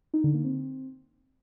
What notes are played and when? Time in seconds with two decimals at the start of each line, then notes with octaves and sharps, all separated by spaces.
0.14 D#4
0.24 D3
0.34 A#3
0.44 C4